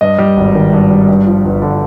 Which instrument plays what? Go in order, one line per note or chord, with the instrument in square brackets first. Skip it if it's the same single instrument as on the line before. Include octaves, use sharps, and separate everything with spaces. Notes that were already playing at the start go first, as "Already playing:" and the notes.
[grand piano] G2 D#5
G3
G#1
D#3
G2
G3
G2
F3
G1
D3